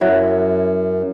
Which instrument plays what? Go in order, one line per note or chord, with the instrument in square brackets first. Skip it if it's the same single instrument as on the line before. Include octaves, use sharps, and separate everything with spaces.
[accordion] F#2 [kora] F#3 E4